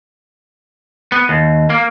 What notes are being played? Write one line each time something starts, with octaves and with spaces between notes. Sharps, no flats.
B3
D#2
A#3